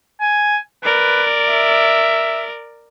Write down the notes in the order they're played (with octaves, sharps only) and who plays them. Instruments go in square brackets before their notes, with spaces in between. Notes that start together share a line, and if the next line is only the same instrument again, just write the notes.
[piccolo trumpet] G#5
[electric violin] A#4 D5 [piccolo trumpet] B4
[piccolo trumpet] E5